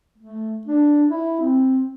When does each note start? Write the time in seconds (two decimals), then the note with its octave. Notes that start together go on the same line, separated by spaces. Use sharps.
0.18 A3
0.67 D4
1.09 E4
1.40 C4